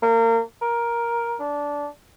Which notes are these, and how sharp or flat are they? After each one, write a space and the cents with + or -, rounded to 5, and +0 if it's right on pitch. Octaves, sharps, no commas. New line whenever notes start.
A#3 -30
A#4 +10
D4 -15